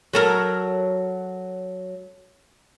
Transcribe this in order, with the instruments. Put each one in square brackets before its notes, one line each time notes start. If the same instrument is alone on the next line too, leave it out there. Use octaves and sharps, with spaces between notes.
[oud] F#3 A4 A#4